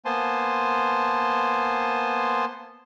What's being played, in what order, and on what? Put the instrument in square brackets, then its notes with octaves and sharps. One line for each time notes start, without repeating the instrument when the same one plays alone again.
[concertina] A#3 B3 C5 G#5 A5 C6